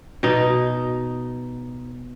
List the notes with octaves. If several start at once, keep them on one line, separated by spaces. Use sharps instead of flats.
B2 D#4